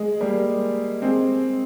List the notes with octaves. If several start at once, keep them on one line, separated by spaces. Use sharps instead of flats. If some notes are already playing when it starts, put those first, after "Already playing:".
Already playing: G#3
G3 A#3
G#3 C4